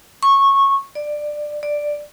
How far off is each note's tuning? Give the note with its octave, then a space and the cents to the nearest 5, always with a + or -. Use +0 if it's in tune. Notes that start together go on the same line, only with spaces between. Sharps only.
C#6 -15
D5 +15
D5 +5